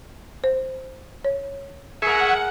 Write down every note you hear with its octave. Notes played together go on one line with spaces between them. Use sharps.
C5
C#5
G#4 A#4 E5 F#5 G#5 C#6